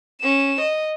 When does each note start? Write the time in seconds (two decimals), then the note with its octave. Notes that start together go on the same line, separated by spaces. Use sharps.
0.21 C#4 E7
0.61 D#5